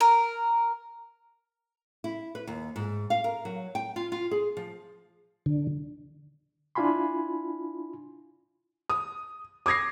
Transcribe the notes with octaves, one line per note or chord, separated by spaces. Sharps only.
A#4
E4
B4
D#2
G#2
F5
A#4
F#3
G5
F4
F4
G#4
F3
D3
D4 E4 F4 G#5 B5 C6
D#6
D6 D#6 G#6 A#6 C7